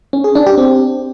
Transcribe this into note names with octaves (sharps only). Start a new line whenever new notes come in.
C#4
G#4
D4
G4
C4